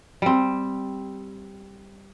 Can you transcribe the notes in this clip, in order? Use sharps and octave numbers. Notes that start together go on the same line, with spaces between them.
G3 C4